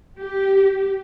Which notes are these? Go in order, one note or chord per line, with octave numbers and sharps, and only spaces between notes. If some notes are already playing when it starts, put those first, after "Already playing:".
G4